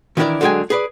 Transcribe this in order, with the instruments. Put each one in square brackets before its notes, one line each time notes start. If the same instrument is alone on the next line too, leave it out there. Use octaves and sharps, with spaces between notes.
[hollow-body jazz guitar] D#3 E3 D4 E4 A#4 D5
D3 F#3 G#3 G#4 G5 G#5
G#4 B4 D5